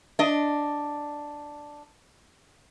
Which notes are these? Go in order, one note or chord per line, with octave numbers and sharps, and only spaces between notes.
D4 D#5